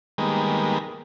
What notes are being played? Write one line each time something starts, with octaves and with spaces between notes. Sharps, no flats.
D#3 G3 G#3 A#3 B3